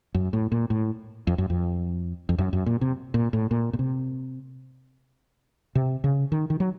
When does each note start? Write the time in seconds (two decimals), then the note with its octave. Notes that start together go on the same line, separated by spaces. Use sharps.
0.14 F#2
0.33 A2
0.52 A#2
0.70 A2
1.27 F2
1.38 F#2
1.50 F2
2.29 F2
2.38 F#2
2.53 F#2
2.66 A#2
2.81 C3
3.14 A#2
3.33 A2
3.51 A#2
3.73 A#2
3.79 C3
5.75 C3
6.04 C#3
6.32 D#3
6.50 D#3
6.60 F#3